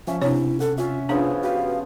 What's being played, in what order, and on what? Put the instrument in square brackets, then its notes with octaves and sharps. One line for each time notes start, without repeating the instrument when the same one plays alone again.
[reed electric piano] F3 [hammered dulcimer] C#4 [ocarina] E5
[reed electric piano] C3 [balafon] D4 C#5 [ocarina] E4
[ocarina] A4 [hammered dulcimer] F#5
[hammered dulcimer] C#4 E5 [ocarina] F4
[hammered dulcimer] C#3 F3 B3 [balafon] D4 [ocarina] F4
[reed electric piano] F#4 G4 B4 [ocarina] F5